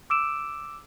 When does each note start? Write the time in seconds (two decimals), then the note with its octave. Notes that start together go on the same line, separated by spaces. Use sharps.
0.10 D6 E6 D7 E7